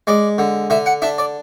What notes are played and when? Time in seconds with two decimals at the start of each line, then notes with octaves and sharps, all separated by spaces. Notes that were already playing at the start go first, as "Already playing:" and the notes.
0.07 G#3 D5
0.38 D3
0.70 D3 E5
0.86 F#5
1.02 D4 E5
1.18 D5